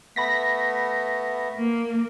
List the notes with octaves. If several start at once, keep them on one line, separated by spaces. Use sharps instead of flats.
A3 B3 B5 A#6 B6
A#3